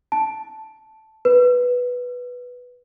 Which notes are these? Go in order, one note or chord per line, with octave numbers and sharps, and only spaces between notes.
A5
B4